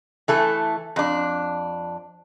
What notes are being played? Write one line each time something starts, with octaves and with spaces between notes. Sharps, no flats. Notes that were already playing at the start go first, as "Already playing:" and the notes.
E3 A3 A4
F2 D4